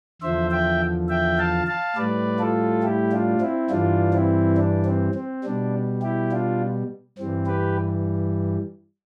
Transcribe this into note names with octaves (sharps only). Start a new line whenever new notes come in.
E2 D3 F3 C5 E5
E5 G5
E5 G5
F5 A5
F5 A5
A2 G3 B4 D5
F4 A4
E4 G4
D4 F4
C4 E4
G2 E3 G3 D4 F4
C4 E4
D4
C4
C4
B2 G3 D4
E4 G4
D4 F4
G2 E3 G3 C4
G4 B4